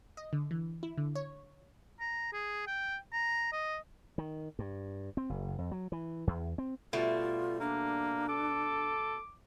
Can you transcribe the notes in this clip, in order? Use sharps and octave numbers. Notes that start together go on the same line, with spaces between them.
D#5
D3
E3
E4
D3
C#5
A#5
G#4
G5
A#5
D#5
D#3
G2
C4
F#1
F2
F#3
E3
E2
C4
B2 G3 A3 F4
A#3 D4
A4 D6